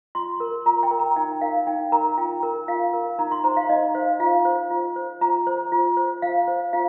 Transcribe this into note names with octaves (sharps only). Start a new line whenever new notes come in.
F4 C6
A#4
F4 A#5
G5
A#4
A#5
D#4 G5
A#4 F5
D#4 G5
A#4 A#5
F4 G5
A#4
F4 F5
A#4
D#4 A#5
C6
C5 A#5
F5
D#4 D#5
C5 F5
F4 F5
C5
F4
C5
F4 A#5
C5
F4
C5
F4 F5
C5
F4 F5